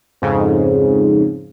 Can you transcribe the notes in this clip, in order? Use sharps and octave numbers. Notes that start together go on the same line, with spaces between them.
F2 G#2 C#3